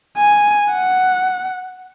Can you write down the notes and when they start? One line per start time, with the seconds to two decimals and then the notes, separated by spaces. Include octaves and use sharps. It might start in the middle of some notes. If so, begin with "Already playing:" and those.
0.17 G#5
0.72 F#5